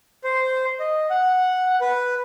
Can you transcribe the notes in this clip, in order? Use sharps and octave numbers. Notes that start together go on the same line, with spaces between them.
C5
D#5
F#5
B4